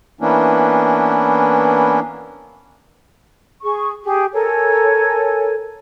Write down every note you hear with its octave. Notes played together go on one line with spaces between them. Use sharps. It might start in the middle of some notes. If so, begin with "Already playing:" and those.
E3 A#3 B3 C#4 D4 E4
G#4 C#6
G4 G#4
A4 A#4 C#5 G#5